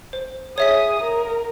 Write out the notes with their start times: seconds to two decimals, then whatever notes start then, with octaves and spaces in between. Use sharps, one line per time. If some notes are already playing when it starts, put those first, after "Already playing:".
0.13 C5
0.58 G#4 C#5 E5 D#6 B6
1.02 A#4